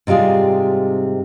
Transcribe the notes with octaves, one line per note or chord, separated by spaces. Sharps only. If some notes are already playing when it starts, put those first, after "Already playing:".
G#2 C3 G3 F4 G#4